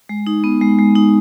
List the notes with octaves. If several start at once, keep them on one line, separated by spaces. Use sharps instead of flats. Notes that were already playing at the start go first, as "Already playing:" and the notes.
G#3
D#4
B3
G#3
G#3
D#4